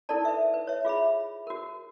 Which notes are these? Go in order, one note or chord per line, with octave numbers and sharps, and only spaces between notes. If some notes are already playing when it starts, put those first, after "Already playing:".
D#4 E4 A4 A#4 D5 A5
B4 E5
B4
C#5 E5
F4 G#4 E5 B5
F#4 A#4